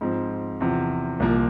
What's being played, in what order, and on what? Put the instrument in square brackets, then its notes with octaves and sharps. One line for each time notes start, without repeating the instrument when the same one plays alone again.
[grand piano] G#2 F3 C4
E2 C3 F3
C2 A#2 F3 A#3